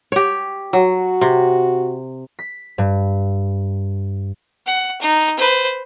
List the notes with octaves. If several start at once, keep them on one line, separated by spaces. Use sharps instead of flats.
G4 C#5
F#3 F#4
C3
B6
G2
F#5
D#4
B4 C5